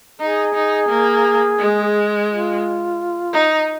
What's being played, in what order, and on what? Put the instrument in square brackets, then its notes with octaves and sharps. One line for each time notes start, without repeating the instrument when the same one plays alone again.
[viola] D#4 [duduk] G#4
[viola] D#4
A#3
G#3
[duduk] F4
[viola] D#4